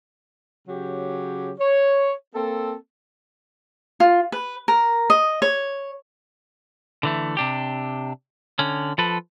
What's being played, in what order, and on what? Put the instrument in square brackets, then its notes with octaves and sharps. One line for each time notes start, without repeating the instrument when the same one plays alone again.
[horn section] C#3 F#3 G4
C#5
A#3 C4 A4
[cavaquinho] F4
B4
A#4
D#5
C#5
[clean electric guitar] D3 E3 A3
C3 D4 G4
D3 C#4
F3 A4 B4